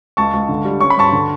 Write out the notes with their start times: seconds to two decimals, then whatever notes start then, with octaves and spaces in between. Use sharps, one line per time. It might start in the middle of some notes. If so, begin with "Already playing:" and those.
0.17 C#2 A5 C#6
0.33 C#2
0.49 D3
0.65 G3
0.81 C#4 C#6
0.90 B5
0.97 G2 A5 C#6
1.13 D3